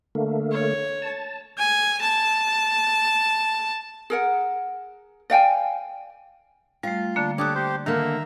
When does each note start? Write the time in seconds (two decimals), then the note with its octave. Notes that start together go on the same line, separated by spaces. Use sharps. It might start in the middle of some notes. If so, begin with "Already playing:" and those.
0.15 D3 A3 A#3
0.52 C#5
1.02 A5
1.58 G#5
2.01 A5
4.10 G#4 A#4 F#5
5.30 D5 F5 G5 G#5
6.83 G3 A3 F4
7.16 D3 A#3 D4
7.38 D4 G4 A4 C#5 D6 D#6 F#6
7.55 G4 C5
7.86 D3 D#3 A#3 E5 A#5